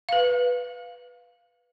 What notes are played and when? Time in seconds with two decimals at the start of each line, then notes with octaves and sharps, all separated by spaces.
0.09 B4 F5